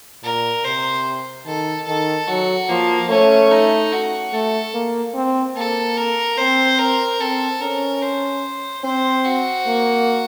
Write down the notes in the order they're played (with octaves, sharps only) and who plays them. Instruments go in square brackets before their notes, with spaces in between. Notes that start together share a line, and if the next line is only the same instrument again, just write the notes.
[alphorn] A#2 [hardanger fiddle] A#4
[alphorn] C3 [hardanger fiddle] C5
[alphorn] D#3 [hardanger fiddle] A4
[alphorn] D#3 [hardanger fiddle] A4
[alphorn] F#3 [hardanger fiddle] F#4
[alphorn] F3 [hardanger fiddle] A#3
[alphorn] A3 [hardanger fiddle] C#4
[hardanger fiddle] D#4
F#4
[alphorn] A3 [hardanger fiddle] A4
[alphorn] A#3
C4
[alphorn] A#3 [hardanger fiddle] A4
[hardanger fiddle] A#4
[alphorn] C4 [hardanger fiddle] C5
[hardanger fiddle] A#4
[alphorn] C4 [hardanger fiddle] A4
[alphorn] C#4 [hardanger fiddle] A#4
[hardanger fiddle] C5
[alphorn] C4 [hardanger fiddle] C5
[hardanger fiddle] F#4
[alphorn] A#3